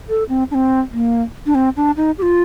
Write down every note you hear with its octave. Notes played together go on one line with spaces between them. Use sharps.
A4
C4
D4
C4
A#3
D4
C4
D4
D#4
G4
F4